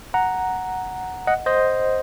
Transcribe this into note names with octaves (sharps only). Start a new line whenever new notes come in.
F#5 A#5
D#5 F#5
C5 D#5